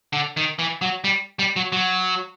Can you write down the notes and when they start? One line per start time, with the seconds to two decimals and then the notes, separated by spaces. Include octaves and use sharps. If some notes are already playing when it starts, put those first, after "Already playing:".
0.13 D3
0.37 D#3
0.59 E3
0.82 F#3
1.04 G3
1.39 G3
1.56 F#3
1.72 F#3